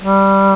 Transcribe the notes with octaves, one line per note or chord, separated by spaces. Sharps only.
G3